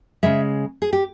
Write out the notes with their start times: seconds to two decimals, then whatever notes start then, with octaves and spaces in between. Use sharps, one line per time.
0.23 C#3 E3 G#3 E5
0.82 G#4
0.93 G4